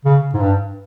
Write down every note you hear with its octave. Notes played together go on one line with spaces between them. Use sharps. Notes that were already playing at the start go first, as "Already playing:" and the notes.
C#3
G#2
G2